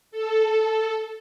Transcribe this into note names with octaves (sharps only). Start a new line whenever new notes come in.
A4